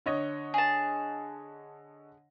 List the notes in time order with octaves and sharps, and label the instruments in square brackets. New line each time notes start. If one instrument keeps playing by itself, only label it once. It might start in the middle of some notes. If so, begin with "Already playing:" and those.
[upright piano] D3 C#5 D#5
[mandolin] G#4 A5